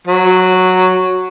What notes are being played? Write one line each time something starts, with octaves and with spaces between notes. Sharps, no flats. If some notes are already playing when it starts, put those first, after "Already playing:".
F#3